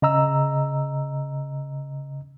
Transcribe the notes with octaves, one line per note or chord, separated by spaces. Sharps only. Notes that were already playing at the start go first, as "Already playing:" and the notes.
C#3 D#5 A#5 E6